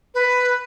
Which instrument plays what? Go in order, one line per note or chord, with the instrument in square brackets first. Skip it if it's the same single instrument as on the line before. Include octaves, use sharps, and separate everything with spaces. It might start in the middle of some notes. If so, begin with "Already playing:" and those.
[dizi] B4